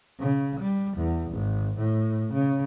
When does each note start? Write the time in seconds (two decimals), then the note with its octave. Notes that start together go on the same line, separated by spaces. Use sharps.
0.19 C#3
0.60 G3
0.98 E2
1.31 G#1
1.78 A2
2.33 C#3